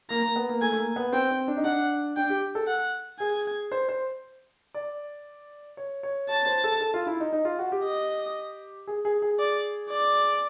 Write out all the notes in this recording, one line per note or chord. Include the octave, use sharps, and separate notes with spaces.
A#3 A#5
A#3
B3
A#3
A3 G#5
A3
A#3
B3
C4 G5
C4
D4
D#4
D4 F#5
D4 G5
G4
A4
F#5
G#4 G#5
C5
C5
D5
C#5
C#5
C#5 A5
C5
A4
A4
F4
E4
D#4
D#4
F4
F#4
G4
D#5
G#4
G#4
G#4
D5
D5